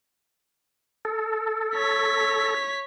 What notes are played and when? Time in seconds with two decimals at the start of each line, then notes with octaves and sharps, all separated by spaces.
1.05 A4
1.75 C#5 B6